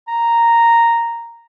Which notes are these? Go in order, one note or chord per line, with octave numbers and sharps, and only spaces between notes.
A#5